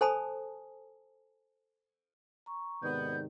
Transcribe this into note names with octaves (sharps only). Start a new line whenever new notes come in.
A4 C5 G#5 A5 B5 D#6
A#5 C#6
G#2 C3 D#3 B3 D5 G6